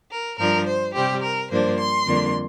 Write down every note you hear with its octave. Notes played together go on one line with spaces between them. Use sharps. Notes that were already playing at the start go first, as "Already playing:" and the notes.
A#4
G2 F3 D4 A#4
C5
C3 G3 C4 G4
A#4
G2 F3 A#3 D4 C5
C6
F2 D3 G3 A#3 D4